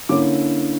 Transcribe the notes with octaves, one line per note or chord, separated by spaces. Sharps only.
D3 A#3 C#4 E4 D6